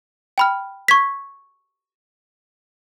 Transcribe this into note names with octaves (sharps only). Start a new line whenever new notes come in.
G5 B5 F6
C#6 G#6 B6